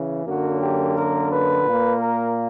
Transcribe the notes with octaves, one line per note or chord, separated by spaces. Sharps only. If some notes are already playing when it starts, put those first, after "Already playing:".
Already playing: C#3 E3
F#2 D3 F#3 A#3 F#4
G4
A#4
B4
A#2 A#3
A#4